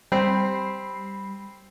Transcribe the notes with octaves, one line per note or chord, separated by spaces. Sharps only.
G3 C4 B5 C7